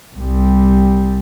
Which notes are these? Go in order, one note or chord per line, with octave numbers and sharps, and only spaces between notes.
C2 G3